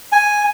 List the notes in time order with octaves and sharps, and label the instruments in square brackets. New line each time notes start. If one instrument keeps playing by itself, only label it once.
[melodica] G#5